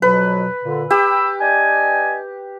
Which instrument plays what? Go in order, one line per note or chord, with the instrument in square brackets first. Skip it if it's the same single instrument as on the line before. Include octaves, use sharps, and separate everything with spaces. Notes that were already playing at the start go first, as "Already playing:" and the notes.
[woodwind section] F2 B2 F#3 [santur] B4
[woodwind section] A#2 D3
[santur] G4 [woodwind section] G5 B5 E6
[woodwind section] D4 D#5 G#5